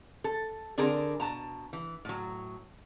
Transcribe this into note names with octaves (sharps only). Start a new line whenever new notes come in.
A4
D3 C4 D4 G#4 A#4
B2 A5 A#5
E3
A2 F#3